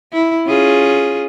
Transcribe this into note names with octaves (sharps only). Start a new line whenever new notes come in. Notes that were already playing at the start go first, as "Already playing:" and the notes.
E4
C#4 F4 G#4